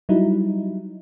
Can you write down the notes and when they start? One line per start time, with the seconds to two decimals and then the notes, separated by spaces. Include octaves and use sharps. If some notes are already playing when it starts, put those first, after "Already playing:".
0.09 F#3 G3 D#4 E4